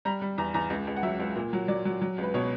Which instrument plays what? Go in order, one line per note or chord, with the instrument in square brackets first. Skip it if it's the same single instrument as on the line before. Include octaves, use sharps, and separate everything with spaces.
[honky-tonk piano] G3 A#5
G3
E2 A#5
E2 A#5
C#2
C#2
F#5
F#3 E5
C#2
A#2
F#3
F#3 D5
F#3
F#3
C#2 B4
B2 C#5